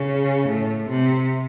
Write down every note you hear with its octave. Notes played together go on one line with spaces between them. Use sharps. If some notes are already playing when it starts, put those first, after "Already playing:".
Already playing: C#3
A2
C3